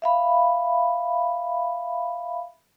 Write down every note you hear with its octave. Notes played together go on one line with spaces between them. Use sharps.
E5 F5 B5